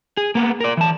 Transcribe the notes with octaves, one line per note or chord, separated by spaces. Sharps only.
G#4
A#3 B3
A#4 D5
E3 A5